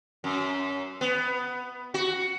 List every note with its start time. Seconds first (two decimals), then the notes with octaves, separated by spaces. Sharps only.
0.24 F#2
1.01 B3
1.94 F#4